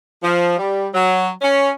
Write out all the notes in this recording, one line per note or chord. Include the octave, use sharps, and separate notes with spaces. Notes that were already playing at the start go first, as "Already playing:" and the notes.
F3
G3
F#3
C#4